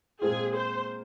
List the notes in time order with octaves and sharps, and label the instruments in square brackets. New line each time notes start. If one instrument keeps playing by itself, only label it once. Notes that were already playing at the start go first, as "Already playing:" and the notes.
[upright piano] A#2 G#3 C4 F4 [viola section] G#4
[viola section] C5